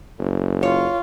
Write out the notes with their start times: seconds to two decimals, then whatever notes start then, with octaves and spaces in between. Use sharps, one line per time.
0.19 F#1
0.63 F4 C#5